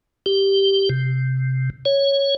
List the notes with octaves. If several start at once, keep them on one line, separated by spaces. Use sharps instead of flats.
G4
C3
C#5